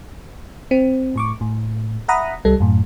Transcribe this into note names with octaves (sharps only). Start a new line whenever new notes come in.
C4
A2 C#6 D6
A2
E5 F#5 A#5 B5 D#6
C2 G3 A4
F#2 A2